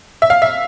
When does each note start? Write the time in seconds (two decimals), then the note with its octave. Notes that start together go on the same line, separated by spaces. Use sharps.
0.22 E5
0.30 F5
0.42 E5